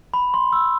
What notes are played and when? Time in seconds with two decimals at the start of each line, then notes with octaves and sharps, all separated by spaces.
0.14 B5
0.34 C6
0.53 E6